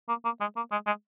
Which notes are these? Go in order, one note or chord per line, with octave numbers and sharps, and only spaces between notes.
A#3
A#3
G#3
A#3
G#3
G#3